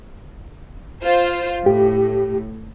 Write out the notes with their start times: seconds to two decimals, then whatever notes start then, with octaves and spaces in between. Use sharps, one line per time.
1.02 F4 C5
1.66 A2 G4